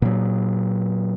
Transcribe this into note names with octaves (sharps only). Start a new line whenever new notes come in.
A#2 F#3